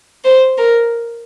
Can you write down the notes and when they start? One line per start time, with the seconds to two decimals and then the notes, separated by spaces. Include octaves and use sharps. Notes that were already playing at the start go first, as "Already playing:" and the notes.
0.25 C5
0.58 A#4